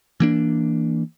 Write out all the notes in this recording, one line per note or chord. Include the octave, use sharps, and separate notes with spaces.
E3 A#3 D4